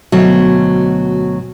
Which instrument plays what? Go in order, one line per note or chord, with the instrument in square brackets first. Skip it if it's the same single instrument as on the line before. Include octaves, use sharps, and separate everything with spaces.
[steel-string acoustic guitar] D2 B2 [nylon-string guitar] F#3